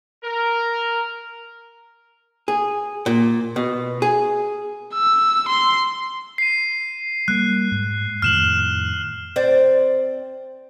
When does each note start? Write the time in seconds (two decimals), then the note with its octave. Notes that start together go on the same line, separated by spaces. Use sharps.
0.24 A#4
2.48 G#4
3.06 A#2
3.56 B2
4.02 G#4
4.94 E6
5.48 C6
6.38 C7 D#7
7.28 G3 A#3 F#6
7.71 G#2
8.22 F2 A2 D#3 F6 E7 F#7
9.36 C4 D5